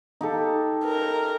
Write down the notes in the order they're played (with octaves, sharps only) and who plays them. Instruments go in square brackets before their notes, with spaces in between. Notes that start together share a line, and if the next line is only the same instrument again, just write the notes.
[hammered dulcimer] D#4 G4 A4
[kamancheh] A#4